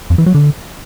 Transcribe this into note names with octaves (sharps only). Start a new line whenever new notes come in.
F2
E3
F#3
D3